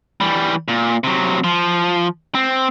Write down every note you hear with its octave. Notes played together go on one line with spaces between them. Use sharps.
E3 G3
A#2
C3 F#3
F3
C4